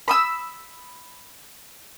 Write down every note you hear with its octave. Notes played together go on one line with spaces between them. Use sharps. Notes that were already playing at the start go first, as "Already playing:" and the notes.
B5 D#6 E6